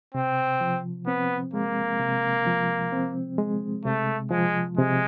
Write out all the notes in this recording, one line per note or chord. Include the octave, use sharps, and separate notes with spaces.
C3 C4
F3
B3 C4
G#3 A#3
C3
F3
C4
G#3
C3 A3
F3 G#3
C3 G#3